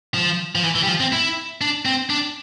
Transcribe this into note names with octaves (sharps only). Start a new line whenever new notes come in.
F3
F3
E3
E3
G3
F3
C4
E4
D4
C4
D4